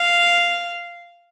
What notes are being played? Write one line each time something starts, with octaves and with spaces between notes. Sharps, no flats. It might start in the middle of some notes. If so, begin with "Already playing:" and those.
Already playing: F5